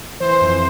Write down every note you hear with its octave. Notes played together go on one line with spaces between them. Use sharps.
E3 C5
F2